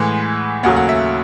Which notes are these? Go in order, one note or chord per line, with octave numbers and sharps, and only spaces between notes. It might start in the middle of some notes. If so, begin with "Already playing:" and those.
Already playing: A2 E3 G#3 F#5
D#2 C#3 F#3 A3 F#5
F#5
E5